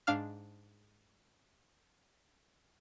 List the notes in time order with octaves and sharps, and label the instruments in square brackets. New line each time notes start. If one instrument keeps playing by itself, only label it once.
[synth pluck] G#2 D4 F5 F6